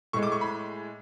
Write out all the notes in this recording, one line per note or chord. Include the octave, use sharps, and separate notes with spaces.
A2 G#3 C#6
D6
C#6
B5